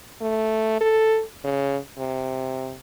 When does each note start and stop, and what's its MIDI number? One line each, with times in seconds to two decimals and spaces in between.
0.21 0.80 57
0.80 1.22 69
1.44 1.77 49
1.98 2.75 48